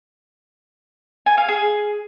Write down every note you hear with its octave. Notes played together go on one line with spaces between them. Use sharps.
G#5
F5
G#4